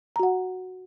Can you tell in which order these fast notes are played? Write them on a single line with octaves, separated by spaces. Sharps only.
A#5 F#4 F#5